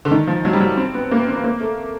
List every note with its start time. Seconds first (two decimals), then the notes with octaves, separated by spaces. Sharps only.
0.05 D3
0.11 D#3
0.27 F3
0.45 F#3
0.53 G3
0.60 F#3
0.77 C4
0.94 B3
1.11 A#3
1.19 B3
1.28 C4
1.36 B3
1.44 A#3
1.61 A3